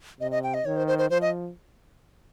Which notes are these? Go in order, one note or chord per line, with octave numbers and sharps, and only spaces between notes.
C3 D#5
D#5
G5
D#5
D#3 C#5
C5
C5
C5
F3 C5
D#5